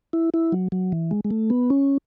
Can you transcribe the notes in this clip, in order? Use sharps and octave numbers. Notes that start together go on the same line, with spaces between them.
E4
E4
F#3
F#3
E3
G#3
G#3
A3
B3
C#4